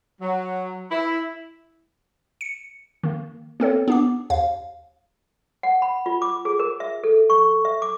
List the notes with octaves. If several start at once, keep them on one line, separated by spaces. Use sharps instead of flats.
F#3
E4
C#7
D#3 A#3
A#3 C4 A4 C#5
B3 D4 D6
D#2 F5
F#5
B5
F4
D6
G#4
A#4
E5
A4
C#6
E5
D6